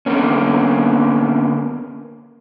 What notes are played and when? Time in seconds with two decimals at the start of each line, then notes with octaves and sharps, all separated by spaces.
0.06 D3 A#3 B3 C#4